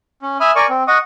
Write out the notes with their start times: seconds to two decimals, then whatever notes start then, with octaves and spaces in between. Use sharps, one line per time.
0.22 C#4
0.40 E5 G#5 B5 D#6 F6
0.56 A#4 D5 G#5 C#6
0.69 C4
0.88 D#5 F#5 C#6 D#6